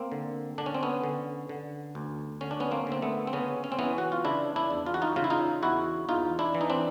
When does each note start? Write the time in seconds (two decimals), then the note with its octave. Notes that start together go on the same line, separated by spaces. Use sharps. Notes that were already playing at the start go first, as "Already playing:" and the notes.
Already playing: A#3 C4
0.12 D3
0.58 D3 D4
0.66 C#4
0.74 C4
0.83 B3 C#4
1.04 D3
1.49 D3
1.95 D2
2.41 D3 C#4
2.51 D4
2.60 B3 C#4
2.71 A#3 C4
2.87 D3 C4
3.02 A3 B3
3.27 C4
3.33 C#3 B3 C#4
3.64 C#4
3.72 C4
3.79 E3 B3 C#4
3.98 F#4
4.12 F4
4.25 C#3 D4 E4
4.56 D4 E4
4.71 E2
4.86 F4
4.94 F#4
5.02 D#4 F4
5.16 C#3 F4
5.24 E4
5.30 D#4 F4
5.63 E2 E4 F#4
6.08 E2 D#4 F4
6.39 D4 E4
6.55 E3
6.61 D#4
6.70 C4 D4